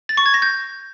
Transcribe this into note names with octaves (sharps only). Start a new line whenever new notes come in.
A6
C#6
G#6
A#6
G6